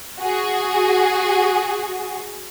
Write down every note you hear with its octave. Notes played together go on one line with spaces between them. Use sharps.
F#4 G#4